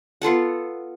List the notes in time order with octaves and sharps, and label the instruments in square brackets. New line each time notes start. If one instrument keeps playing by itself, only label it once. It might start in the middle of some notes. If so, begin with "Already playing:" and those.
[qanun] B3 F4 A4 F#5